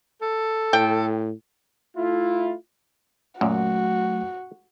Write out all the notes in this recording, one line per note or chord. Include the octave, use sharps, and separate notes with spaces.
A4
A2 G5
A3 E4 F4
F#2 A#2 F#3 A3 F#4